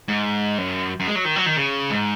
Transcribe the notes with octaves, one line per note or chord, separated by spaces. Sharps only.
G#2
F#2
F#2
G#3
F#3
D#3
F#3
D#3
C#3
G#2